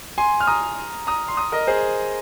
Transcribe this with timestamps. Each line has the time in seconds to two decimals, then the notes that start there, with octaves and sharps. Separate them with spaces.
0.18 G#5 C6
0.40 F6
0.47 A#5 D#6
1.07 A#5 D#6
1.28 C6
1.37 A#5 D#6
1.52 A#4 D#5
1.67 G#4 C5